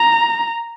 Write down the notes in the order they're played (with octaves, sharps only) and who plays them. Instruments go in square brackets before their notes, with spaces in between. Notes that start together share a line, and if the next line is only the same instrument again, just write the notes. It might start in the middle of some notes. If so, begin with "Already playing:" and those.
Already playing: [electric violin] A#5